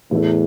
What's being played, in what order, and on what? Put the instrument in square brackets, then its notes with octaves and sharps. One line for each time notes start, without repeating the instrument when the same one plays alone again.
[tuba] E2 [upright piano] A2 E3 A3